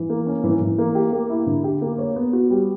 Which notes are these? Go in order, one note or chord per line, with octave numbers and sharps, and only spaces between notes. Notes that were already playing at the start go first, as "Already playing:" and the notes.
Already playing: E3
A#3
C#4
E3
E3
A#3
G4
A#3
E4
D3
G4
A#3
C#5
B3
F#4
G3